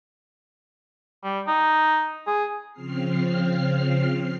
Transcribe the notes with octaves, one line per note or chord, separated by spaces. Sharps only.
G3
D#4
G#4
C#3 F3 C4 F6 C7